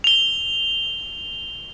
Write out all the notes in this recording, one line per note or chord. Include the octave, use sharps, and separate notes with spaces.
F7 G7